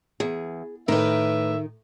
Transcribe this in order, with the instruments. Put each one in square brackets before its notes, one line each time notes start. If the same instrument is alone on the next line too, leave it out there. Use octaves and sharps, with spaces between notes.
[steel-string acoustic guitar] E2 [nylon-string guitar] G#4
[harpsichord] A2 [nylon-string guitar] D#3 D#4 [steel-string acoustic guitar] A#4 B4 [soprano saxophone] E5